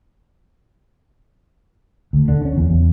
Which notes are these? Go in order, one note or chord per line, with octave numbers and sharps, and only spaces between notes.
D2
D3
C#4
E2
E2